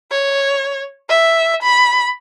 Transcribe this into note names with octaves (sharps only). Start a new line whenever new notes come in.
C#5
E5
B5